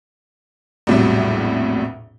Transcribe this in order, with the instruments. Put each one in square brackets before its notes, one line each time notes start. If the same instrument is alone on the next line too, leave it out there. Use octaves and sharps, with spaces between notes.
[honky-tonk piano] A#1 E2 A2 C3 F#3 G3